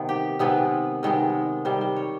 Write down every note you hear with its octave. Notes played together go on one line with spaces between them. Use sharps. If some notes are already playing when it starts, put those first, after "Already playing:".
Already playing: C3 D#3 B3
G4
C3 D#3 G#3 B3 B4
C3 D#3 G#3 B3
C3 D#3 G3 C5
C5
C#5